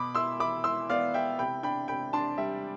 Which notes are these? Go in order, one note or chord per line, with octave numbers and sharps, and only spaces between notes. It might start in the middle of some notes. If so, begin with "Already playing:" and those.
Already playing: B2 B5 D6
E4 C6 E6
E4 B5 D6
E4 C6 E6
B3 D5 F5
E4 E5 G5
C3 G5 B5
D4 G5 B5
C3 G5 B5
D4 A5 C6
G3 E5